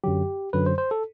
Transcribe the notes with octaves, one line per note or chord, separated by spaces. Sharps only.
F#2 D3 F#3 G4
F#2 D3 F#3 B4
C5
C5
A4